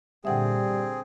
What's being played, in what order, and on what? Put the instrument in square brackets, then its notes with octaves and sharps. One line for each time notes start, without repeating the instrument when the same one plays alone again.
[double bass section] A#2 D3 [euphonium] G3 [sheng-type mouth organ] C4 G#4 [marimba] E5 F#5 G5